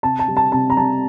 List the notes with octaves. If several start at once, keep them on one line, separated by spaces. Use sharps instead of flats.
C3 A5
A5
G3
A5
C3 A5
A#5
G3 A5